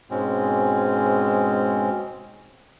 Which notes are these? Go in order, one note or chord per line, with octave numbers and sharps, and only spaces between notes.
G#2 B2 G#3 C4 C#4